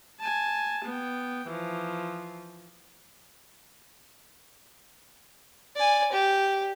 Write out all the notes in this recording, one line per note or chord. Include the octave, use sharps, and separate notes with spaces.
G#5 A5
B3 G5
E3 F3
D5 G#5
G4